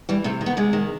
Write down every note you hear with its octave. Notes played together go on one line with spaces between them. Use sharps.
E3 G3
C3 A3
D#3
B3
C3 G#3
D#3